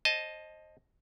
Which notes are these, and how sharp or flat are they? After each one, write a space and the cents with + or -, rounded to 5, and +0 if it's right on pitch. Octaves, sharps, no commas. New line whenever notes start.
C5 +30 D#5 +0 A5 -10